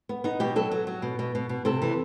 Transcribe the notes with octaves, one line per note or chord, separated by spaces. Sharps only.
B3
B3 D#4
B2 G4
F#3 A4
F#3
F#3
B2
B2
B2
B2
C3 A4
E3